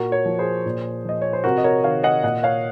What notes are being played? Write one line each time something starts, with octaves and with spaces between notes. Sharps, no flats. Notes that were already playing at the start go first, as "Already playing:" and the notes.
Already playing: A#2 F#4 A#4
A#4 C#5
F3
G#4 C5
A#2
F3 D#5
C#5
C5
C3 F#4 A#4
D#5
A#4 C#5
D#3 C#5 F5
D#5 F#5
A#2 D#5 F#5
C#5 F5